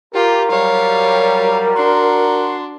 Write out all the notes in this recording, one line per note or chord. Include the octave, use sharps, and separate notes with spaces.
F4 G4 A#4
F#3 G3 C#5 F5
D4 F#4 C6